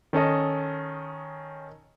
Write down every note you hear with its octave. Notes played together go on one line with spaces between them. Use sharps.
D#3 C#4 A4 D#5